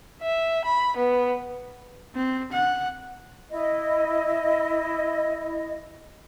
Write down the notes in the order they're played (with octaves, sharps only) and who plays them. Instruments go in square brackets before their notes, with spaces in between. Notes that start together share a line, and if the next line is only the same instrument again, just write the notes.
[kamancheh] E5
B5
B3
[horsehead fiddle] C4
F#5
[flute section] E4 D#5